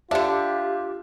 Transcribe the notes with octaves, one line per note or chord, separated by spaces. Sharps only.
D3 D4 F4 G4 E5